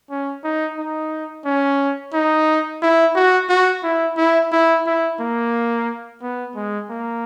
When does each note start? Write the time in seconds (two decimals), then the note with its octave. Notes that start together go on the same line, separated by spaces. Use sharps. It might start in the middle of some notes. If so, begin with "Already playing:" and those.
0.10 C#4
0.44 D#4
0.78 D#4
1.45 C#4
2.14 D#4
2.82 E4
3.15 F#4
3.49 F#4
3.84 E4
4.17 E4
4.52 E4
4.86 E4
5.20 A#3
6.22 B3
6.55 G#3
6.89 A#3